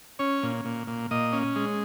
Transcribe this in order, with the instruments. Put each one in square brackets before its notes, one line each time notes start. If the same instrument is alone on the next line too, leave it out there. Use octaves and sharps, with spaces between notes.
[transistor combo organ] C#4 C#5
A#2
A#2
A#2
A#2 D#5
C#4
G#3